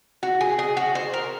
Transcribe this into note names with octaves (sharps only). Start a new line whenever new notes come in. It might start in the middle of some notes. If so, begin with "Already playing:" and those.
F#4
G#4
G#4
F#4
C5
A#4